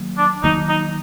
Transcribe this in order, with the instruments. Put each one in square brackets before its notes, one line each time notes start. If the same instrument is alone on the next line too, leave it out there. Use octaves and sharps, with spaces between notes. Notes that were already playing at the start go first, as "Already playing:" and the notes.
Already playing: [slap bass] D#3 F#3 A#3
[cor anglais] D4
[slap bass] D#3 F#3 A#3 [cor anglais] D#4
[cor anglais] D#4